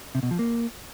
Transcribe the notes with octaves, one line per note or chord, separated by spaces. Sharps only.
C3
B2
F3
A#3